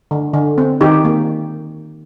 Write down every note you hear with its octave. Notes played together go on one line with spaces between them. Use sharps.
D3
D3
C4
D#3 D#4 G4
A#3